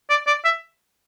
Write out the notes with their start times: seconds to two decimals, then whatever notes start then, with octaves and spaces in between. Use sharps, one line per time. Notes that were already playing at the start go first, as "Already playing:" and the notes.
0.10 D5
0.27 D5
0.45 E5